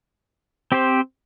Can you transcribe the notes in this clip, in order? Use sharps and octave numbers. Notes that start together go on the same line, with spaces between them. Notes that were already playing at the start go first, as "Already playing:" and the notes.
C4 G4 C5